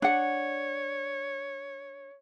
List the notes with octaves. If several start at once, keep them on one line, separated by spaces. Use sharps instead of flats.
D4 C#5 F#5